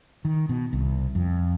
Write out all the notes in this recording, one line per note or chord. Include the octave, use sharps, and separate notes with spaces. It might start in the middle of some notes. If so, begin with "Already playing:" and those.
D#3
B2
C2
F2